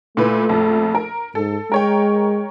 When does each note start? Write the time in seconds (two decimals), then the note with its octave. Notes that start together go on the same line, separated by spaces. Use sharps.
0.17 A#2 A3 E4 B4
0.49 A#1 F2
0.95 A#4
1.35 G#2 A4
1.72 G#3 A#4 C#5 G5